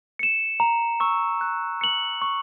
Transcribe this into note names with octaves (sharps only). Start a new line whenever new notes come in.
C#7 E7
A#5
C#6 E6
F#6
C#7 F#7
C#6